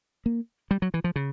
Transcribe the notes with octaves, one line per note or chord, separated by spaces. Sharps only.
A#3
G3
F#3
E3
F3
C#3